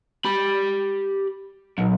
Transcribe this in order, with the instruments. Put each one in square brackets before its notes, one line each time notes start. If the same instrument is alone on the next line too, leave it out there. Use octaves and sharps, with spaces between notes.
[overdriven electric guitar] G4 B5
[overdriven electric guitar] B1 [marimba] A#2 F#3